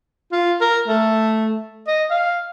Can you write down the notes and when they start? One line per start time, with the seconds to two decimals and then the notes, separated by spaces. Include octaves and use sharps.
0.32 F4
0.61 A#4
0.88 A3
1.87 D#5
2.10 F5